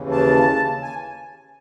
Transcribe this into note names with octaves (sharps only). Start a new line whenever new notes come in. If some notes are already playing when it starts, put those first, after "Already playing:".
Already playing: D#2 C#3 E3
A5
G#5